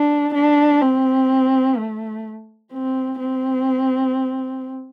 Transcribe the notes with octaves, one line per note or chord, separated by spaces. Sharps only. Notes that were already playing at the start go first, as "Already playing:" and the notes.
Already playing: D4
D4
C4
A3
C4
C4